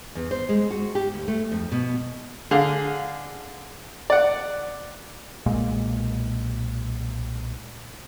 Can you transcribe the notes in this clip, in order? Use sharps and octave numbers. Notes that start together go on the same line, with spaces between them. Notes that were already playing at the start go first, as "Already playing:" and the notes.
E2
C5
G#3
F#4
G4
D2
A3
F2
B2
D3 G#4 F5
D5 F#5
B1 A#2 G#3 A#3